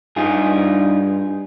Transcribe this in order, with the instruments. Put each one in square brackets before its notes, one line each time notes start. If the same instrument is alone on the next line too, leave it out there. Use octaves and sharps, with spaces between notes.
[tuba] G2 [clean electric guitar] D#4 F4 G#4